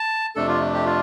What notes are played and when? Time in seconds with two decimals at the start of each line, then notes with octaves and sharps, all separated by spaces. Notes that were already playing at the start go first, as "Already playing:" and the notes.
Already playing: A5
0.36 F2 C3 A3 D4 A4
0.48 F4
0.74 G4
0.86 F4